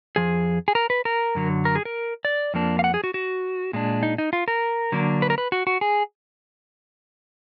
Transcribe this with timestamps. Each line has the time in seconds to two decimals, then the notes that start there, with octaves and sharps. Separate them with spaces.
0.16 F2 F3 G#4
0.68 G#4
0.75 A#4
0.90 B4
1.05 A#4
1.35 F#2 D3 F#3
1.65 A#4
1.75 G#4
1.85 A#4
2.25 D5
2.54 F2 F3 A#3 D4
2.79 F5
2.84 F#5
2.94 G#4
3.04 F#4
3.14 F#4
3.73 A#2 G#3 D4
4.03 D#4
4.18 D#4
4.33 F4
4.48 A#4
4.92 D3 F#3 A#3 D4
5.22 B4
5.30 A#4
5.38 B4
5.52 F#4
5.67 F#4
5.81 G#4